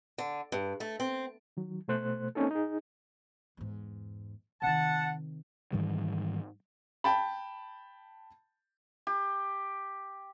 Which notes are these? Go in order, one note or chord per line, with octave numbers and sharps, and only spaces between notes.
D3
G2
A3
C4
D#3 F#3
B2 A3 C5 F#6
A#3 C4 C#4 D#4 A4
D#4 G#4
E2 G#2
C3 D#3 F#5 A5
G#2 D#3 E3 G3
G5 A5 B5
G4